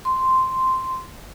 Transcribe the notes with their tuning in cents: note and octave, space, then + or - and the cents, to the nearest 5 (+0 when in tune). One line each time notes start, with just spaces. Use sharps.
C6 -5